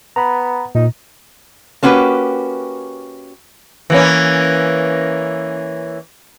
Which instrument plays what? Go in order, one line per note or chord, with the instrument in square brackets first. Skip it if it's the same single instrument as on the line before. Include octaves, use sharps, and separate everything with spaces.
[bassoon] B3 [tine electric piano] A#5 B5
[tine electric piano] A#2 [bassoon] D#4
[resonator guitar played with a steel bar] A#3 C#4 F#4 G4 B4
[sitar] E3 A#3 C#4